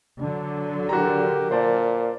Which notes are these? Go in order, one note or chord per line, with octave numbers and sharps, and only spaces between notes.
D3 F#3 D4
F#4 G4 A#4 A#5
A#2 C5 D5 A5